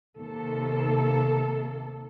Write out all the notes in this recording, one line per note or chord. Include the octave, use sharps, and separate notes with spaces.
D#2 C3 A#3 A4